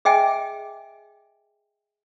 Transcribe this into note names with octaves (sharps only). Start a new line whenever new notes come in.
G#4 D#5 E5 G5 G#5